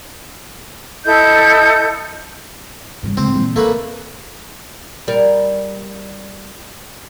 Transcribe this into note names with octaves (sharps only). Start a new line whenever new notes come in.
E4 A4 D#5 G6
G2 C#3
G#2 C4
A#2 E3
A#1 A3 A#3 B4
G3 A#4